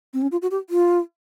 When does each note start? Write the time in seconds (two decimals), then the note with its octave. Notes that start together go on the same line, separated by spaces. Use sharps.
0.13 C4
0.22 C#4
0.32 F4
0.42 F#4
0.51 G4
0.70 F4